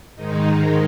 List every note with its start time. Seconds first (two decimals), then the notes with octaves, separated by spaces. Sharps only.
0.16 G#2 D#3 G#3 D#4